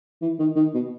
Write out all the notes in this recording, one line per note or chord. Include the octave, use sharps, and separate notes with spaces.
E3
D#3
D#3
B2